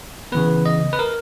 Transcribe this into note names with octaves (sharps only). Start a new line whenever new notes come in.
C#3 E3 B3 B4
D#5
B4
A#4